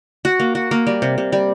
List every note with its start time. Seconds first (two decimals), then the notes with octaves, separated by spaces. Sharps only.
0.25 F#4
0.40 A#3
0.55 F#4
0.71 A#3
0.87 G3
1.02 C3
1.18 C3
1.32 G3